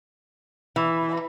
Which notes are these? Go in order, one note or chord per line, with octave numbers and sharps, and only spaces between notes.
E3